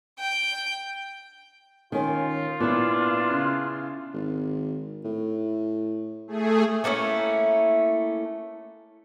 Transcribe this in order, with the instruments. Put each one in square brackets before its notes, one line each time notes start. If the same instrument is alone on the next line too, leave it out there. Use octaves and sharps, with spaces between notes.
[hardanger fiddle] G5
[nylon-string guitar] D#3 C#4 [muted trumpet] F4
[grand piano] A#2 [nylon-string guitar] B3 E4 [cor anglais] D4
[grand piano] C#3
[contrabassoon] G#1
A2
[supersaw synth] A3 G#4
[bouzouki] A3 A#3 C#4 E4